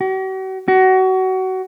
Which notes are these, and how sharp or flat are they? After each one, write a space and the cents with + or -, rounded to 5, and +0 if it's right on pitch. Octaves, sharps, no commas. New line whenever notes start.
F#4 +45
F#4 +25